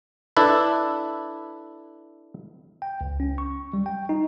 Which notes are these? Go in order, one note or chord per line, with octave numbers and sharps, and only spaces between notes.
D4 E4 A4 B4
G5
C#2
C#4
C#6
G3
G5
D#4